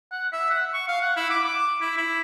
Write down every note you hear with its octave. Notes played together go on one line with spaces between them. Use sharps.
F#5
E5
F#5
C#6
F5
F#5
E4
D6
D6
E4
E4